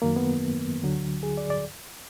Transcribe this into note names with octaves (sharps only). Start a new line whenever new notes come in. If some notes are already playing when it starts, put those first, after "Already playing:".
F#2 D#3 F#3 A#3
B3
D2 D3 F#3
G#4
D5
D5